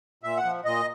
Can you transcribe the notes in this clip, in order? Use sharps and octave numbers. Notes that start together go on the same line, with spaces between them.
A#2 E5
F#5
F3
A#2 D#5